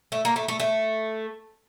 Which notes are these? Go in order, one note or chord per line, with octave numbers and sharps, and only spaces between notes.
A3
A#3
A3
A3
A3